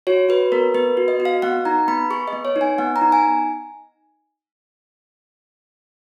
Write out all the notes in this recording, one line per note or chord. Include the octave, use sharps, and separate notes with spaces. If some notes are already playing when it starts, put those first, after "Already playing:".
F#4 C#5
F#4 B4
B3 A#4
B3 B4
F#4
D#5
F#4
F5
B3 F#5
D#4 A#5
B3 B5
G#4 C#6
D#5
B3
C#5
D#4
G#5
B3 F#5
A#5
D#4
G#5